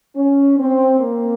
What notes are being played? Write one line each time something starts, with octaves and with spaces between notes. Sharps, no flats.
C#4
C4
A#3